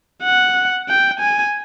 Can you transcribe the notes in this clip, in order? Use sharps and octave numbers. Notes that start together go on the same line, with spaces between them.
F#5
G5
G#5